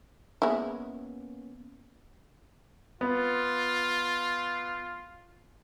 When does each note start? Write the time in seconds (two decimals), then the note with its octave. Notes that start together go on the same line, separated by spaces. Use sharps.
0.42 G#3 A#3 B3 C#4 E4
3.01 B3 F4